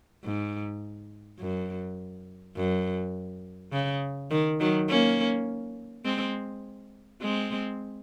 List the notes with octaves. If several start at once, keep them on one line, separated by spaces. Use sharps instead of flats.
G#2
F#2
F#2
C#3
D#3
D#3 F#3
A#3 C#4
G#3 C4
G#3 C4